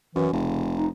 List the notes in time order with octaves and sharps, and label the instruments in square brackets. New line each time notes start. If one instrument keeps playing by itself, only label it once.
[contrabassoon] F#2 [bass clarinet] E3
[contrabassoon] F1 [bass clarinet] C#3
[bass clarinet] D#4